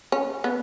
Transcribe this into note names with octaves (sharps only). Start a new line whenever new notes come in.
C#4
B3